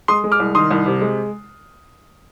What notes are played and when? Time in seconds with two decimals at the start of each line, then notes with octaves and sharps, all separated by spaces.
0.08 G#3 C6 D#6
0.24 G#3
0.31 D6 F6
0.40 C2
0.55 D#3 C6 D#6
0.71 C2
0.86 C3
1.01 G#3